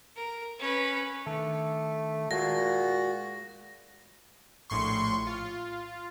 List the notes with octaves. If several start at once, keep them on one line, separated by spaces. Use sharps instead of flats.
A#4
C#4 B4
D#3 A3 D4
A#2 G#3 F#4 G#4 F5 A#6
A#1 A2 C6 C#6
F4